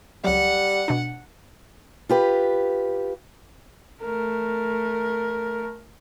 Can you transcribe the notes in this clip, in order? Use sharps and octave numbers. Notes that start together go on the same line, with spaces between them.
C#2 F#3 G3 F#5
B2 D4
F4 G4 B4
A3 A#4